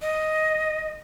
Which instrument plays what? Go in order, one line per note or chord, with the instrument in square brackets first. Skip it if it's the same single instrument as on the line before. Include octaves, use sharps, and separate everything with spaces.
[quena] D#5